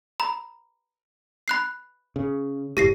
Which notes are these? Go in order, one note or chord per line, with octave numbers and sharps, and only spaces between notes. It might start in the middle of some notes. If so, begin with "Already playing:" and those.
A#5 B5
B5 F#6 C7
C#3
F#1 A2 G4 A#6 C7